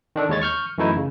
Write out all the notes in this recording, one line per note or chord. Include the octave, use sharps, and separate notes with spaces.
D#3 D4 A4
D#2 G#3 C#5 A6
C#6 F6 G6
F#2 E3 A3 D#4 E4
C#3